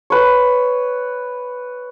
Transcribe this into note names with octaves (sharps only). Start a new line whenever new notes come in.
B4 C#5